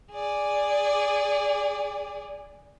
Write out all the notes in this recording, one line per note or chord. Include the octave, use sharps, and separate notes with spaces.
G#4 D5